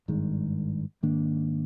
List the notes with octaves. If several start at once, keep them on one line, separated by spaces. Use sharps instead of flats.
G#1 G2 D#3 G#3
G#2 D#3 A#3 D4